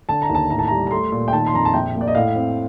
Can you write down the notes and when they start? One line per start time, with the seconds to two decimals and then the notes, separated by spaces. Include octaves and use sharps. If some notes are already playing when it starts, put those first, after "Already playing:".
0.09 D3 A5
0.22 A#5
0.30 D#2
0.35 A5
0.50 A2 A#5
0.59 A5
0.68 G3 A#5
0.87 A#5
0.91 A3 C6
1.12 A#2
1.28 G5
1.33 D#3 A5
1.47 C6
1.54 F2 A#5
1.65 A5
1.74 A#1 G5
1.95 A#3
2.01 D5
2.08 D#5
2.15 A2 F5
2.36 C4